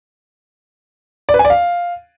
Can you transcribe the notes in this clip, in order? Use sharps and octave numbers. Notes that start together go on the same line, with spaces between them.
D5
B4
G#5
D5
F5